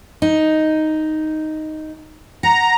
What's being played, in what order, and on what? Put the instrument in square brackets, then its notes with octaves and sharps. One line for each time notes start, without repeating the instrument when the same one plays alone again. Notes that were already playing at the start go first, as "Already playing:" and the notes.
[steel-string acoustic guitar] D#4
[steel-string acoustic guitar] F#5 [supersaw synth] A#5